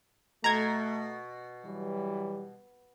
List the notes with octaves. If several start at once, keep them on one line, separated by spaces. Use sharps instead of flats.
B2 A3 A#5 G#6
E3 F#3 G3